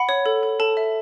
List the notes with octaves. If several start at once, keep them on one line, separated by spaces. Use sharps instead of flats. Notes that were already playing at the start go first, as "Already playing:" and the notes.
Already playing: F#5 B5
C#5
A4
A4
A4 A5
E5